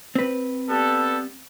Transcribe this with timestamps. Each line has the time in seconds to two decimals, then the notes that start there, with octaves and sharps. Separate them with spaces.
0.15 C4 B4
0.69 G3 B3 A4